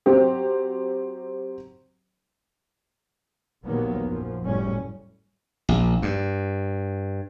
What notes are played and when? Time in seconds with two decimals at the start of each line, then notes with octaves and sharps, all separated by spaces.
0.06 F#3 C4 G4
3.65 A#1 D#2 F#3 A#3 B3
4.05 F#2 F3
4.44 F#1 A2 G3 C#4
5.69 A#1
6.02 G2